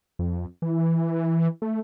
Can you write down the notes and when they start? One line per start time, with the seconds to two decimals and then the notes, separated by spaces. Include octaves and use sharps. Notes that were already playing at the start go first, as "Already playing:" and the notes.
0.19 F2
0.62 E3
1.62 A3